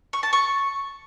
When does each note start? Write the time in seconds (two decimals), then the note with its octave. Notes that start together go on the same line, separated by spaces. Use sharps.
0.13 C#6
0.23 A5
0.33 C#6